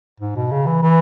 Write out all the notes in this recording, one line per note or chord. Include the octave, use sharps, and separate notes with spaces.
G#2
B2
C#3
E3
E3